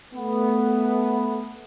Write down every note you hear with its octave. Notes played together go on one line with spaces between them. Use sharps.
A3 B3